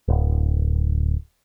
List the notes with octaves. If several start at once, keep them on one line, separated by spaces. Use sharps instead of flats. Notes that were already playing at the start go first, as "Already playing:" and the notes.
D1